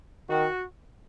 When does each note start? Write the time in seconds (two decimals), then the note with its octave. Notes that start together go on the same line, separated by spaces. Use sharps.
0.29 D#3 F#4